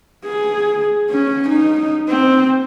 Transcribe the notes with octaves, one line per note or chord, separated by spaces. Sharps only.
G#4
C#4
D#4
C4